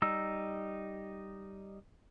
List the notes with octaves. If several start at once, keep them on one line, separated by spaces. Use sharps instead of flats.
G3 D#4 E6